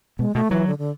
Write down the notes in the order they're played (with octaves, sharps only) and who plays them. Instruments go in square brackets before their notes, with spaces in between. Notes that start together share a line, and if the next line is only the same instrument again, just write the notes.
[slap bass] B2 [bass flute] G#3
[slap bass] B2 [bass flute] A3
[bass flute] E3 [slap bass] F#3
[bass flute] D3
D3